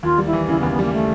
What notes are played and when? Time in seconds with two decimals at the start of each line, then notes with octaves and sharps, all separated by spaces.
0.03 D#2 F4
0.18 G3
0.26 E4
0.33 E3
0.48 C#3 E4
0.59 B3
0.63 D#2
0.70 B3
0.79 G3 A#3
0.93 A3